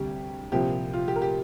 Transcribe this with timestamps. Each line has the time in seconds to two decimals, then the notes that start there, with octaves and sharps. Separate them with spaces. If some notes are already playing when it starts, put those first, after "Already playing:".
Already playing: D2 C3 G3 G4
0.52 C2 A#2 F3 C4 G4
0.93 F4
1.08 G4
1.16 A#4
1.22 G4